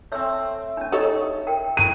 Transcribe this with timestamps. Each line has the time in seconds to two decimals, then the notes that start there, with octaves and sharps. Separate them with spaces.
0.12 A3 C4 C#5 E6
0.77 C#4 D4
0.92 D#4 A4 C#5
1.47 A#4 G5
1.77 C#6 D#7